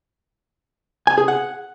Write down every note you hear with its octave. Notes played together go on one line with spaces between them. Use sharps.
G#5
G#4
F#5